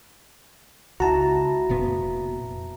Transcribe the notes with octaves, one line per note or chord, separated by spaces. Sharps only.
C#2 E4 F#4 A5 A#5
F1 A#2 B3